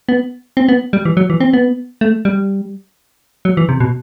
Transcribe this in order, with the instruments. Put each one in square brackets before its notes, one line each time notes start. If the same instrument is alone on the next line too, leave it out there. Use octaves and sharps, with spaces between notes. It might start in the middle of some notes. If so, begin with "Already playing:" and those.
[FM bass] B3
C4
B3
G3
E3
F#3
E3
C4
B3
A3
G3
F#3
E3
C3
B2